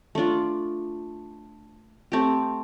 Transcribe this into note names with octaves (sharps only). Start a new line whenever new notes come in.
A3 D4 F4
A3 C4 G4